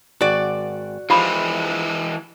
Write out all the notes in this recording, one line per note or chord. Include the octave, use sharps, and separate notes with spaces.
G#1 F#4 D5
E3 F3 G#3 F4 G4 B5 D6